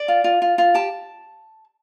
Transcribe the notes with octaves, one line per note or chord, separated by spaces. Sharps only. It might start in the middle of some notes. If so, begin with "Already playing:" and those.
Already playing: D5
F4
F4
F4
F4
G4 A5